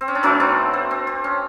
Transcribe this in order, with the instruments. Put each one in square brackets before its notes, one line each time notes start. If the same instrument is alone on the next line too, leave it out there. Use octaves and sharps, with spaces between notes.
[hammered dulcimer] C4
C#4
D4
B2 F#3 A3 C#4 D#4
C4 D4
C4
C4
C4
C#4